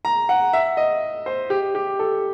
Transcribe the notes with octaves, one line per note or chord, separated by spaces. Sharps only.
A#5
F#5
E5
D#5
C5
G4
G4
A4